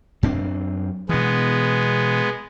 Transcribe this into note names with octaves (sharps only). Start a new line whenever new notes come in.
F#2 C4 D4
B2 E3 G#3 B3